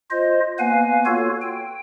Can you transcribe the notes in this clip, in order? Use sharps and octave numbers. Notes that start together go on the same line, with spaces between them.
F4 C5 D#5
A#3 B3 B4 F5 G#5
F4 F#4 A4 C#5
G5